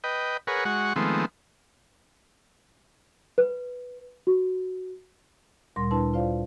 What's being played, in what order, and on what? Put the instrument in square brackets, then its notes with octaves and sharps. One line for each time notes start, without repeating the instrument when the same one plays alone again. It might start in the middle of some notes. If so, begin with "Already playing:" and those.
[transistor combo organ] B4 D#5 G5
G#4 A#4 B4 C#5 F#5
G#3 F#4 F#5 C#6
D#3 F3 G#3 A3 B3 C4
[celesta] B4
F#4
[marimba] D2 A#2 G3 A#4 C6 A#6
D4 E4 B4 A5 C6
F4 C5 D5 F5